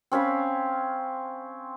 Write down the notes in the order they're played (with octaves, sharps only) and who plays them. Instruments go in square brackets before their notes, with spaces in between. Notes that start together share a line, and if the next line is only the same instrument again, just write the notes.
[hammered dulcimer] C4 C#4 F5 B5